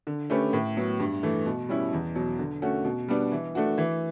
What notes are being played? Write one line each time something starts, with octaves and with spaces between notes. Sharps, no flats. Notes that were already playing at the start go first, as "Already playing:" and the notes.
D3
A3 C#4 G4 B4
A2
F#3 B3
G2
E3 A3
B2
G3 C#4 E4
E2
B2 F#3
D3
A3 C#4 F#4
B2
G3 B3 D4
E3
A3 D4 F#4
E3